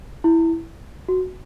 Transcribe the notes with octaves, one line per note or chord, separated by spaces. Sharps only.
E4
F#4